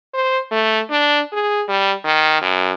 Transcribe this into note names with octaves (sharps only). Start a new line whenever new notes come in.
C5
A3
D4
G#4
G3
D#3
F#2